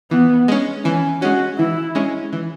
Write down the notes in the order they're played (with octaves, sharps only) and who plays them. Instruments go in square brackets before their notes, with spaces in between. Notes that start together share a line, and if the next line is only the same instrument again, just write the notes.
[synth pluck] E3 [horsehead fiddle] B3
[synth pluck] G#3 C#4
[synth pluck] E3 [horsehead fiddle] C#4
[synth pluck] G#3 C#4 [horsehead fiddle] F#4
[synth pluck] E3 [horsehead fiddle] E4
[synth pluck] G#3 C#4
E3